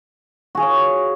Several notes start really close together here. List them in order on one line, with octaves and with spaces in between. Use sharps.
F#4 G#4 F5 C#5